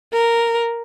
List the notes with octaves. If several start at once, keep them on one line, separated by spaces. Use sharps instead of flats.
A#4